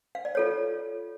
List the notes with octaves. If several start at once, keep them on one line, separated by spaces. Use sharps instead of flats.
F5
D5
F4 A4 C#5